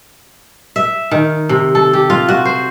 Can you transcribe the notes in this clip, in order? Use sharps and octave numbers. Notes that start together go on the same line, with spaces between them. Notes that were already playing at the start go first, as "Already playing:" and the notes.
E5
D#3
C3
A4
G4
F4
F#4
C5